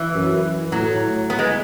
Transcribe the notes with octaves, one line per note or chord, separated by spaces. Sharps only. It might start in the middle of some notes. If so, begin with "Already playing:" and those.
Already playing: E3
F#2
A2 F#3
B3
G#3